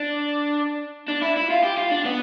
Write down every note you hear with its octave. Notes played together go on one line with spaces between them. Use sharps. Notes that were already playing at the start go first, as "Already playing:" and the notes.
Already playing: D4
D4
E4
E4
F4
G4
F4
D4
B3